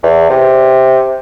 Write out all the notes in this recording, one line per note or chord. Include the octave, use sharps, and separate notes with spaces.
E2
C3